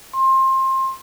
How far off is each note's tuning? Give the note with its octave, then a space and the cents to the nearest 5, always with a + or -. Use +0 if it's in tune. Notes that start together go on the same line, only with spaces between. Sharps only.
C6 +25